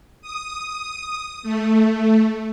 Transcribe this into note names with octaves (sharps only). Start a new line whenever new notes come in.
D#6
A3